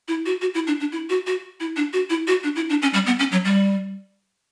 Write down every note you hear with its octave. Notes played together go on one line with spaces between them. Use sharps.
E4
F#4
F#4
E4
D4
D4
E4
F#4
F#4
E4
D4
F#4
E4
F#4
D4
E4
D4
C#4
G3
B3
C#4
F#3
G3